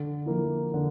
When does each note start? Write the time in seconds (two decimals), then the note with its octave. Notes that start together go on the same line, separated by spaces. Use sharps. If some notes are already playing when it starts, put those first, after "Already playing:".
Already playing: D3
0.26 F3 A#3 E4
0.74 D3